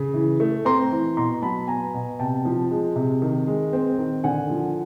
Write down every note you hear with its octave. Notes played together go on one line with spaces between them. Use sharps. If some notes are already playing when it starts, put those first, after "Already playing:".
Already playing: C#3
E3
A3
C4 A#5 C6
E3
B2 A#5 C6
F#3 A5 B5
B3 G#5 A#5
B2
C3 G5 A5
F3
G#3
C3
D#3
G#3
C4
D#3
D3 F#5 G#5
F3